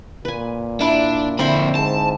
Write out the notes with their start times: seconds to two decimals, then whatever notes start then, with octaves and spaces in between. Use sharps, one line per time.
0.25 A#2 B4 G#5
0.81 D4 E4
1.39 F2 D3 C4 E4 G5 B5 C#6
1.75 G#2 A5